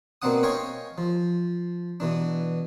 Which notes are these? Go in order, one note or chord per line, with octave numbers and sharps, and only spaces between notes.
B2 A#3 C4 D4 F#5 D#6
C#5 D#5 F5 G5 G#5 C#6
F3
B2 E3 D4